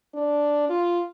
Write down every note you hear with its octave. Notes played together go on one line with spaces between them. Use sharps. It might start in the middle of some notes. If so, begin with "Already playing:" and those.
D4
F4